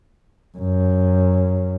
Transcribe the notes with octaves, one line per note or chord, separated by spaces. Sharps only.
F#2